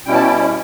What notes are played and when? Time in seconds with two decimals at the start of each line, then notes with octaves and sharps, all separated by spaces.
0.06 B2 G3 C#4 E4 G5
0.15 A5
0.23 G5